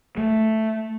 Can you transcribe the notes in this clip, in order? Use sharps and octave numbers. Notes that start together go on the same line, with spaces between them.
A3